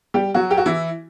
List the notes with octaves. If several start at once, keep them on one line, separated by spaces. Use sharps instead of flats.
G3 G4
F#3 F#4
G4
F#4
E3 E4